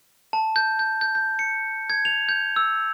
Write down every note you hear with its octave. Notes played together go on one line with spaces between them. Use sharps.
A5
G6
G6
G6
G6
C#7
G#6
F7
G6
E6